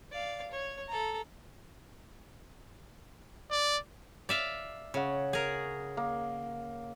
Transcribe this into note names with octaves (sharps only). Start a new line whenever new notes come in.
D5 F5
C#5
A4 A#5
D5
D5 E5 F5
C#3 C#5 F#5
G#4 A#4
A#3